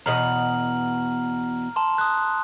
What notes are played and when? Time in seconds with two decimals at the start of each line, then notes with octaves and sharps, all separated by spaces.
0.06 E2 B2 D#5 A#5 F6 F#7
1.76 A5 C6
1.98 D#6 F#6